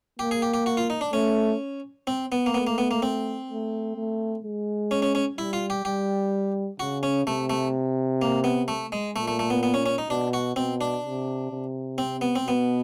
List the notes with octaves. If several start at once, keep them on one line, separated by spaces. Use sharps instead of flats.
A#3 G4
G#4
G4
G4
F#4
F4
D#4
D4
A3 C#4
C4
B3
A#3
A3 B3
A#3
B3
A#3
C4
A3
A3
G#3
C#4
C#4
C#4
G3 E4
F4
G4
G3 G4
C#3 F#4
C#4
C3 A3
A3
A#3
B3
A3
G#3
A#2 A3
A3
A3
B3
B3
C#4
C#4
D#4
B2 D4
F#4
B2 C4
D4
C3
C3
C4
B3
C4
B2 B3